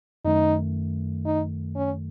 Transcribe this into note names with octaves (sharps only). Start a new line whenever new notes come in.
F#2 D#3 A3 D#4
D#4
C#4